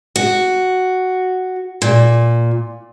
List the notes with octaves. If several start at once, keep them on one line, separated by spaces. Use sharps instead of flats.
F#4
A#2